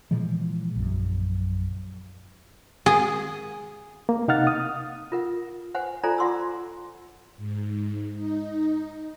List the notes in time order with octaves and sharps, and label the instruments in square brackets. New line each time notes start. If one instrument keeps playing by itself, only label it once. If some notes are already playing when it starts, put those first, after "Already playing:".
[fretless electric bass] A#2 E3 F3 G#3
A#1 F#2
[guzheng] G#4
[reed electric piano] A#3
C3 D#4 F5 F#5 F6 A6
D#6
[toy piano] F4 A#4 F#5
B4 C5 F#5 G#5
F4 A4 C5 D5 G#5 A#5
F4 F#5 C6 D6 E6
[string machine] G#2
D#4